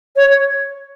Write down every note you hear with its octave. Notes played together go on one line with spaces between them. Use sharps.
C#5